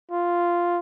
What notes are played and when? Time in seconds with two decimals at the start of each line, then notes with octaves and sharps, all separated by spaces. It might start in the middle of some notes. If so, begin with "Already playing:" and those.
0.12 F4